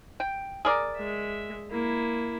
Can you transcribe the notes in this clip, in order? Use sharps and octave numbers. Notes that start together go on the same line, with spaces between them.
G5
G#4 A#4 D5
G#3 E5
A#3 E4